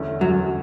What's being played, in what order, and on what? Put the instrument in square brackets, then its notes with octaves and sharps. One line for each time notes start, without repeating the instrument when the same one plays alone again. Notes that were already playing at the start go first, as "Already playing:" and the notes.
Already playing: [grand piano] E2 D3 A3 C#4 E4
[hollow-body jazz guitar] F#2 F#3